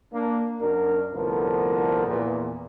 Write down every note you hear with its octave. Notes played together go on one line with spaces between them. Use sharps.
A#3 D4
F#2 D4 F#4 A#4
C2 A2 D3 F3 B3 A#4
E2 A#2